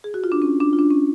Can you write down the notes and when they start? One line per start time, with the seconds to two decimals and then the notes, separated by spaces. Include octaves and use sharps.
0.04 G#4
0.14 F#4
0.24 F4
0.32 D4
0.42 C#4
0.60 D4
0.73 F4
0.79 D4
0.90 C#4